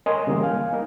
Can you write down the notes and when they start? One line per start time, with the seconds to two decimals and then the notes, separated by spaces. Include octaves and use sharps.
0.06 A#4 C#5 D#5 G#5 C6 D#6
0.27 C#3 E3 G3 A#3 C#4
0.42 F5 G#5
0.73 A#3 D#4 A#4